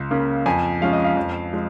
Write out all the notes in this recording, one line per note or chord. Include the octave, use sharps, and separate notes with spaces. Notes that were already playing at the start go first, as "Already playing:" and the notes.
Already playing: C#2
C#3 A#3
F2 G#5
F3 G#3 C#4 F5
D#5
F5
F2
F3 G#3